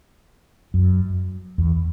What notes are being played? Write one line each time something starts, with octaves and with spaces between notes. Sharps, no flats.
F#2
E2